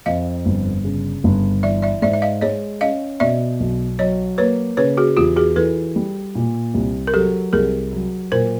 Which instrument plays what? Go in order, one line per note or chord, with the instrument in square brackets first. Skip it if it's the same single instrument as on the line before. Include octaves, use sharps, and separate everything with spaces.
[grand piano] F2 [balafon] D#5 F5
[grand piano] G1
C#3
G1
[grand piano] E3 [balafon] D5 E5
[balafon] D5 E5
[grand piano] G#2 [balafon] D5 E5
[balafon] E5
D#5 F5
[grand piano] G#3 [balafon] C#5 D#5
[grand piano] C#4 [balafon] D#5 F5
[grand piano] B2 [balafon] D5 E5
[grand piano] B1
[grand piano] F#3 [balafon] C#5 D#5
[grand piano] A#3 [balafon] B4 C#5
[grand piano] C#3 [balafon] B4 C#5
[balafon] F#4 G#4
[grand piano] E2 [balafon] F4 G4
[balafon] F#4 G#4
[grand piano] E3 [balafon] A4 B4
[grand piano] G3
A#2
C2
[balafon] A#4
[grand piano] F#3 [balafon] G4 A4
[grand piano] C2 [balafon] G#4 A#4
[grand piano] F#3
[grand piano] A#2 [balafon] A#4 C5